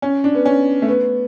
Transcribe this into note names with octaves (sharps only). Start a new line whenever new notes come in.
C#4
D4
B3
C#4
A3
B3